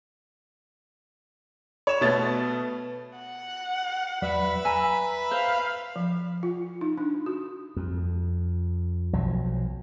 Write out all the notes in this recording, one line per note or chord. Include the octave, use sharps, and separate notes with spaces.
C#5 E7
B2 A3 B3 A6
F#5
E2 F#3 B4 D5 E5 B5
G#5 A#5 E6
C5 F5
F3
F4
D#4
D4
F#4
F2
B1 F3 F#3